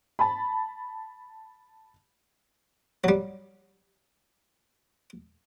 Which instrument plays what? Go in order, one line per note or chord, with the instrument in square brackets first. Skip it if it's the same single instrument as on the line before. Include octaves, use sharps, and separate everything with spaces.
[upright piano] A5 B5
[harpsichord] F#3 G3